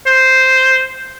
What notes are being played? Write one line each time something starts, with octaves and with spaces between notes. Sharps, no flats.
C5